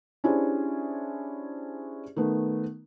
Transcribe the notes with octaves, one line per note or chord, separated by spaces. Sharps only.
C#4 D4 E4 G4 G#4 C5
D#3 A3 B3